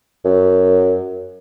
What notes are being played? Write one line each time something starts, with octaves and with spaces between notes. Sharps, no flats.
F#2